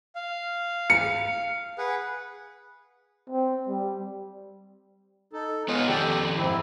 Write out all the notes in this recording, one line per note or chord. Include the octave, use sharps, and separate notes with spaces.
F5
C#7
G#4 B4 F#5
C4
G3
D#4 A4
G#3 B3 F4 C#5 D#5
F2 D#3 G4 A4 D5 G5
G#2 C4 E4